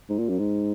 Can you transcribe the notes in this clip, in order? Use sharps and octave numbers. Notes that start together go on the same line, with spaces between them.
G#2
A#2
F#2
G#2